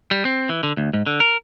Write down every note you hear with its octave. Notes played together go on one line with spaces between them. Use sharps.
G3
C4
E3
D3
D2
G#2
D3
A#4